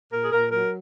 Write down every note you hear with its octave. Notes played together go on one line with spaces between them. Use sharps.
A#2 A#4
G#4
A#2 A#4
F#3 A#4